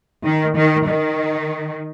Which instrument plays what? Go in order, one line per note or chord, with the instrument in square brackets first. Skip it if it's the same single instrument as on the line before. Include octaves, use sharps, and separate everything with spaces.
[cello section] D#3
D#3
D#3